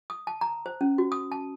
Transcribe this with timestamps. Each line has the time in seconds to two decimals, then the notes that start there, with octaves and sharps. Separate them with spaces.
0.10 D#6
0.27 A5
0.41 A#5
0.66 C5
0.81 C#4
0.98 F#4
1.12 D#6
1.32 A5